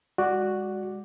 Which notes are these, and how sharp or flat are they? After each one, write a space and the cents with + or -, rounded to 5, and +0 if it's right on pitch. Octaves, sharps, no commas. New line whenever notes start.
G#3 -30 F#4 +0 D5 +0